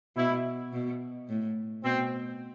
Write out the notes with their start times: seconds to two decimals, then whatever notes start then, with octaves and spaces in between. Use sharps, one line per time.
0.16 B2 E4
0.72 B2
1.28 A2
1.83 B2 C4